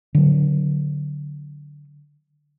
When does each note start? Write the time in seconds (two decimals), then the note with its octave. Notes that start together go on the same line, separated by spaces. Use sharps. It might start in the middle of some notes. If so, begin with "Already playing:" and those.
0.15 D3 F#3